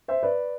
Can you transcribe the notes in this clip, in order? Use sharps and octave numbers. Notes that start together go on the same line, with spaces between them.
C5 E5
B4 D5